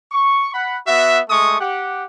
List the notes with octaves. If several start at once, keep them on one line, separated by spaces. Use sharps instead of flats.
C#6
F#5 B5
B3 F#4 E5
G#3 A3 C#6 D#6
G4 F#5